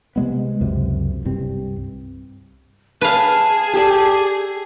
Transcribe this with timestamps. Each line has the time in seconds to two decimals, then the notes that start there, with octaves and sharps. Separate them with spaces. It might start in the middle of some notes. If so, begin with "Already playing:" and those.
0.16 C3 G#3 B3
0.61 C#2 F#2 C3
1.25 C2 G2 G3 C4
3.01 G#4 B4 F5 A5
3.74 G4 A4 D5